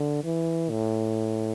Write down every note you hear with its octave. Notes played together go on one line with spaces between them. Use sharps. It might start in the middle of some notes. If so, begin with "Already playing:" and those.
Already playing: D3
E3
A2